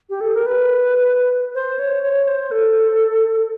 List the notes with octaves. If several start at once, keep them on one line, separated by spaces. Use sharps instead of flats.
G4
A4
A#4
B4
C5
C#5
C#5
C5
A4